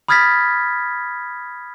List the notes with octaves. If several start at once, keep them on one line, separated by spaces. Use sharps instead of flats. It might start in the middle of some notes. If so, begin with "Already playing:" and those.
B5 D#6 F6 G#6 A6 B6